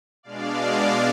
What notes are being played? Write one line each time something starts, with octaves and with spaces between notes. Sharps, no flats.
B2 G#3 D4 D5 F5